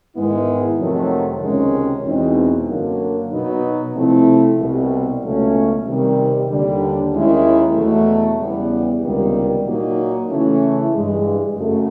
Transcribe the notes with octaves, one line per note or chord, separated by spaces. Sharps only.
G#2 D#3 G#3 B3 E4
F2 C3 D#3 F#3 A3
C#2 C3 D#3 G#3 C#4
E2 B2 G#3 C4 D#4
F#2 D3 F#3 A#3
B2 F#3 B3 D#4
C3 F3 A3 C4 E4
C2 B2 G3
C#2 B2 F#3 A3 C#4
C3 D#3 G3
D#2 D3 G3
D#2 D#3 G#3 C#4 E4
E2 B2 F#3 A3
E2 C#3 E3 G3 B3
C#2 C3 D#3 G3 B3
A#2 F#3 A#3 D#4
C#3 E3 A3 C#4 E4
G2 E3 G#3
F#2 C#3 F#3 A3